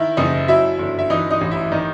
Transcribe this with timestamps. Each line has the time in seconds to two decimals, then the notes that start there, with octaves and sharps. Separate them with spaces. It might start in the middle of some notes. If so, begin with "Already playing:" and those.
Already playing: D#3 E4 E5
0.17 F#1 D#4 D#5
0.48 F#3 E4 E5
0.79 G1
0.99 E5
1.10 E3 D#4 D#5
1.31 D#4 D#5
1.41 A1
1.51 E4 E5
1.72 D#3 D#4 D#5